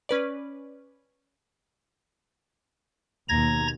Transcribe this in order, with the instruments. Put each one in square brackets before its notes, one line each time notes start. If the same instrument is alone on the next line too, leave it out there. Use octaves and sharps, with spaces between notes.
[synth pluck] C#4 B4 D5
[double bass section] D#2 B2 [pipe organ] A#5 G#6 A#6